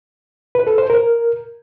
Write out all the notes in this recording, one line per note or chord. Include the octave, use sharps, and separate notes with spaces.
B4
A4
C5
A#4